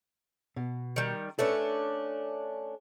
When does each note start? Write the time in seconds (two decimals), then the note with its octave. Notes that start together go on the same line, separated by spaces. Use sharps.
0.56 B2
0.96 D#3 G3
1.39 A3 C#4 D4 A4 B4 C#5